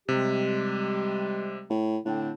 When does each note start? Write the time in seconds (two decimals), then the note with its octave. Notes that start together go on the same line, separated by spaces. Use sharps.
0.09 C3 G3 G#3 G4
1.70 A2
2.05 A2 D3 C4 D4